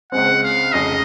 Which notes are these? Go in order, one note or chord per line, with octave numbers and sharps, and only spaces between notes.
C#2 C#3 G#3 C4 F#5
F5
F1 F2 C#3 G#3 D#5